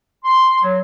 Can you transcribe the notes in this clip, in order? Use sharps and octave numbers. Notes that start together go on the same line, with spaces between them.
C6
F#3